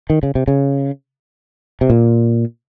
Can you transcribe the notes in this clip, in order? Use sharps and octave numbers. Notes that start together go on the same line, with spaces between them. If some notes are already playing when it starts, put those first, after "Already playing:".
D#3
C#3
C3
C#3
C3
A#2